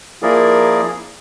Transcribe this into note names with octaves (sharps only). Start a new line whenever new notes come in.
F3 A#3 E4 G#4 A#4 D5